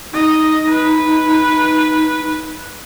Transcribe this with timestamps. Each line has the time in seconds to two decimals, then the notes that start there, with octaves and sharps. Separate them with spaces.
0.13 D#4 D#5
0.69 B4